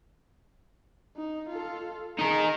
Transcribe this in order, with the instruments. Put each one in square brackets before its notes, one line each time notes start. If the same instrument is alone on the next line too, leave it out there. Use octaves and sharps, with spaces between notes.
[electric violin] D#4
F4 A4
[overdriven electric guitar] D#4 A#4 [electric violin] G#4 A#5